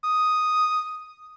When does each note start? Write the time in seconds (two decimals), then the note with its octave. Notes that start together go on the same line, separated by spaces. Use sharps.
0.04 D#6